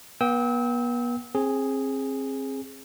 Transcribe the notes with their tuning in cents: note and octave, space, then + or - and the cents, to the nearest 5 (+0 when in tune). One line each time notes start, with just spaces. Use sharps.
B3 -40 G5 +0 E6 -35
C4 +30 G#4 +0